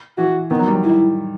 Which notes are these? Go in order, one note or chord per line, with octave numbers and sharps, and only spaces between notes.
E3 F#4
D#3 B3
F#3
G3
F#3
E4